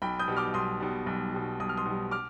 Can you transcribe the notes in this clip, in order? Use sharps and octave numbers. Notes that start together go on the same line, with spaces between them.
B1 G5 B5
D#6 G6
B2 G3
D6 F6
B1 C6 D#6
B2 G3
B1
B2 G3
B1 D#6
F6
C6 D#6
B2 G3
D6 F6